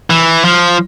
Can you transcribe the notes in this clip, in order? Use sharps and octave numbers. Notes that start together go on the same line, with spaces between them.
E3
F3